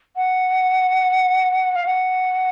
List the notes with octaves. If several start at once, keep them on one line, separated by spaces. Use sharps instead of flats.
F#5
F5
F#5